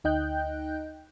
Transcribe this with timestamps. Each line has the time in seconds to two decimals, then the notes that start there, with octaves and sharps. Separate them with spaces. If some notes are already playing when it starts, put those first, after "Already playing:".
0.04 D2 D#4 D#5 G5 F#6 G6